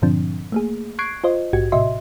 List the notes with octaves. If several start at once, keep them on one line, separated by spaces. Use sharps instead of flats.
G2 A#2 D3 F3 C4 D4
A3 A#3 G#4
C#6 F#6 G#6 C7 D7
F4 C5 D#5
A#1 G#2 F#4 G4 G#6
A2 C3 F#4 D#5 E5 C6